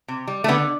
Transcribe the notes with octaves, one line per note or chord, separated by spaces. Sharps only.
C3
G3
A3
D3 B3